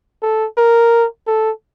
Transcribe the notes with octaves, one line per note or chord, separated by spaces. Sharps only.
A4
A#4
A4